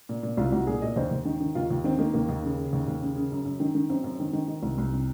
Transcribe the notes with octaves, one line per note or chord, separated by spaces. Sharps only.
A#2
A#2
C2 F4
C2 F#4
A#2 G#4
A#2 D#5
D#2 C5
D#2
D#3
D#3
D#2 F4
D#2
D#3 C4
D#3 A#3
D#2 A#3
D#2
C#3
C#3
D#2
D#2
C#3
C#3
F#2
F#2
D#3
D#3
F#2 C4
F#2
D#3
D#3
D#3
C2
C2
C3